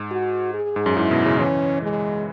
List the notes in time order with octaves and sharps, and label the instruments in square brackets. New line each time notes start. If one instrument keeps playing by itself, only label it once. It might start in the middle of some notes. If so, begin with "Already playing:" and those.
Already playing: [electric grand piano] G#2
[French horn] F#4
G#4
[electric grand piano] G#2
F#2
[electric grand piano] G#2 [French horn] E4
[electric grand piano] B2
C#3
[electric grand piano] E3 [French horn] C#4
[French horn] G#3